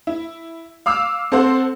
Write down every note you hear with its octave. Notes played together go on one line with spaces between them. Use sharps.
E4
F5 D6 E6 F6
C4 A4 C5 F#5